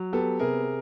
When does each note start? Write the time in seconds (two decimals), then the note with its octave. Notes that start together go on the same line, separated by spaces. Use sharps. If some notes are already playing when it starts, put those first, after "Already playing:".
Already playing: F#3
0.13 B3 G4 A4
0.39 C3 G#4 A#4